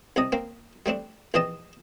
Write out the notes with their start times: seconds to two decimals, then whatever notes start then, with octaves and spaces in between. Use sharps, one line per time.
0.16 C2 C3 D#5
0.32 A#3 C4
0.86 G3 A3 C4 D4
1.34 A#1 E3 C4 D#5 A5